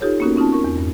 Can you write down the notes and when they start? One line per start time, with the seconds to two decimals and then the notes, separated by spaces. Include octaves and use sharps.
0.01 D#4 F4 G4 A4 C#5
0.20 A#3 B3 C#4 D#4 F#4 A#4
0.36 C4 C#4 D#4 F4 A5
0.52 A#4 C#6
0.64 E2
0.77 E2 G2